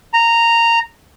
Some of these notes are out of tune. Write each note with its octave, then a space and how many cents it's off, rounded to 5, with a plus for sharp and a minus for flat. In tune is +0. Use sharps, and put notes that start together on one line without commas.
A#5 -10